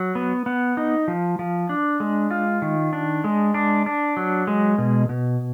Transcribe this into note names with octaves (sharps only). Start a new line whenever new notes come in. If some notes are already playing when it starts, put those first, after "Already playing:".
Already playing: F#3
B3
B3
D#4
F3
F3
D4
G#3
F4
D#3
D4
G#3
D4
D4
F#3
G#3
B2
B2